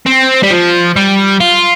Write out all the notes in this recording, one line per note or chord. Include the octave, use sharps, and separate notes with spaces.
C4
G3
F3
G3
F4